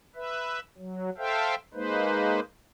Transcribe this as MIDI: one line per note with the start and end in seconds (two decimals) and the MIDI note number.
0.15 0.60 71
0.15 0.60 76
0.78 1.10 54
1.18 1.55 69
1.18 1.55 72
1.18 1.55 76
1.18 1.55 77
1.18 1.55 79
1.74 2.40 56
1.74 2.40 58
1.74 2.40 63
1.74 2.40 71
1.74 2.40 72